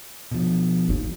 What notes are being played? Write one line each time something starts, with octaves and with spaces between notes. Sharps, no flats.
B2 F3
A#3 D#4